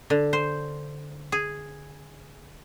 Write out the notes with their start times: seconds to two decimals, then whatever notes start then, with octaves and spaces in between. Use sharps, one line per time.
0.10 D3
0.33 C5
1.32 G#4